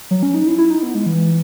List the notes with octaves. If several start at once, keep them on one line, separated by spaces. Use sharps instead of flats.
F#3
C#4
D#4
E4
E4
D#4
B3
G#3
E3